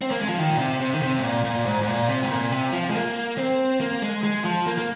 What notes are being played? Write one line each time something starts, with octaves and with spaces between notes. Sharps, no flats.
C4
A#3
G#3
F3
D#3
A#2
C3
C3
D#3
C3
G#2
A#2
A#2
G#2
G#2
A#2
C3
G#2
A#2
C3
F3
G#3
A#3
C4
A#3
G#3
G#3
F3
A#3
A#3